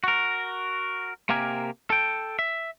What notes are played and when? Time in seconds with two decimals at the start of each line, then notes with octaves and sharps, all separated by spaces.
0.04 F#4 A#4
1.29 C3 A#3 G4 A#4 G#5
1.90 A4 G5
2.39 E5